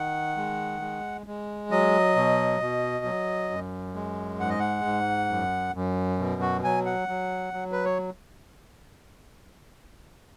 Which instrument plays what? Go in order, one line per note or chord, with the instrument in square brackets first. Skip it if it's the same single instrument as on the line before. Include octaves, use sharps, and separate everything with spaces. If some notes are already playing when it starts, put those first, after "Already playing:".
Already playing: [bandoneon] D#3 F#5
G#3
G#3
G#3
F#3 D#5
B2
B2
F#3
F#2
G#3
G#2 F#5
D#5
F#5
G#2
F#2
F#2
B2
F#4
F#3 G#5
F#5
F#3
F#3
B4
C#5